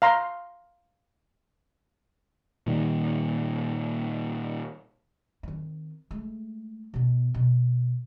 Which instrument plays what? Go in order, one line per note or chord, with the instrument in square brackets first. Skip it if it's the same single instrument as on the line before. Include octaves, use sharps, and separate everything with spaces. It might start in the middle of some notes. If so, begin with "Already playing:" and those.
[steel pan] F5 A#5 C6
[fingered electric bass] A#2 D#3 G3
[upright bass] D#3 C4
G#3 A3
B2 B3
B2